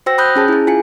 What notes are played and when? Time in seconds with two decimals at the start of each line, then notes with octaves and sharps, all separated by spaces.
0.06 F#4 C5 G5 E6 A#6
0.18 B5 D#6 F#6 G6
0.36 C#4 G#4 A5
0.48 E4 G#4
0.67 F4 G#5 C#7